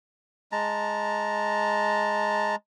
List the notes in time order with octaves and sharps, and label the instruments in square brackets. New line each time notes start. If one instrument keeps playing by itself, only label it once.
[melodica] G#3 A5 A#5